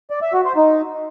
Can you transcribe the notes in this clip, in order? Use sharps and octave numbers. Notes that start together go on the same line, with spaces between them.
D5
E5
F#4
C5
D#4